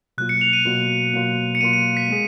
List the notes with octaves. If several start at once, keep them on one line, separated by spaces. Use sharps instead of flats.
B2 F#3 A#3 F4 F#6
C#7
F7
D#7
B2 F#3 A#3 F4
B2 F#3 A#3 F4
C#7
B2 F#3 A#3 F4 D#7
D#7
B6
G#3 B3 F4 G#4